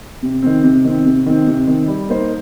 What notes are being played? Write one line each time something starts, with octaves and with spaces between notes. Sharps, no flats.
C3
D#3 C4
C3
D#3 C4
C3
D#3 C4
C3
D#3 C4
G3
A#3 D#4 C5